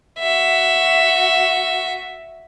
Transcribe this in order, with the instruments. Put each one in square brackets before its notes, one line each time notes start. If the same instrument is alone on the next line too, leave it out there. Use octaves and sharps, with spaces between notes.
[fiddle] F#4 E5